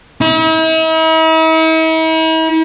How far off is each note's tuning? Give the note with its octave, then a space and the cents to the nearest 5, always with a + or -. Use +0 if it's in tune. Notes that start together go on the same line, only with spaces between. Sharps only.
E4 -45